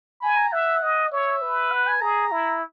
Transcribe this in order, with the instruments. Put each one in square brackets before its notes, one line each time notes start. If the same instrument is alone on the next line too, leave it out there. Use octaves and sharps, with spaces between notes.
[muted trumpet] G#5 [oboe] B5
[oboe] A#5
[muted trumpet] E5 [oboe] F#5
[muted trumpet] D#5
[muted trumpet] C#5 [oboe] E5
[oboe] E5
[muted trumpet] B4
[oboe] F#5
G#5
[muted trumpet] G#4 [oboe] A#5
[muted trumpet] E4